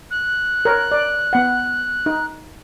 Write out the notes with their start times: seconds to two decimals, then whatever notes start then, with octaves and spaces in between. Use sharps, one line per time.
0.11 F#6
0.65 A#4 C#5
0.92 D5
1.33 B3 F#5
2.06 D#4